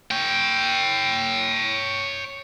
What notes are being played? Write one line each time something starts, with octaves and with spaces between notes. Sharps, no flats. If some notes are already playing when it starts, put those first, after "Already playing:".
C#5 G5